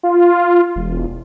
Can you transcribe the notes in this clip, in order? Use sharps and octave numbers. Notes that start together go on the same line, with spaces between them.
F4
E1